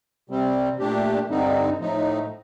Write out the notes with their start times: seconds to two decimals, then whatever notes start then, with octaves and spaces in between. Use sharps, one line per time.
0.30 C3 G3 C4
0.79 A#2 A3 D4 G4
1.29 G2 D3 G3 C4 D#4
1.80 A2 F3 A3 D#4